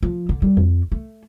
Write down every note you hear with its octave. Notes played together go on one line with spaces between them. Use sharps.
F3
D3
G3
F2
A3